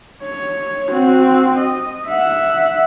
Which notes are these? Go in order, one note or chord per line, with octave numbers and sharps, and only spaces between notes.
C#5
C4 F#4
D#5
E5 F#5